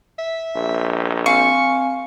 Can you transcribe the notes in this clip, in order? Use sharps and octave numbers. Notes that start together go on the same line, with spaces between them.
E5
A#1
C4 F5 G#5 C#6